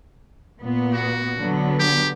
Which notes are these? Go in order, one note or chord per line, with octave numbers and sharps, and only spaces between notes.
A#2 B3
F#4
D3 F#3 B3
G4